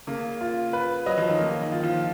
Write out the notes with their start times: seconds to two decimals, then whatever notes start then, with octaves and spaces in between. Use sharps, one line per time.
0.07 C#3 A#3
0.41 F4
0.73 B4
1.06 F#3 D#5
1.18 F3
1.28 D#3
1.39 C#3 A#3
1.61 D#3
1.72 F4
1.83 F3